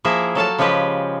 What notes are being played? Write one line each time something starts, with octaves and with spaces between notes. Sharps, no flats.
F3 A#3 E4 G#4 E5
F#3 A4 F5 A5
C#3 F3 G#3 G4 B4